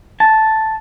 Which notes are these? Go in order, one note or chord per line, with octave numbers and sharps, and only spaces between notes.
A5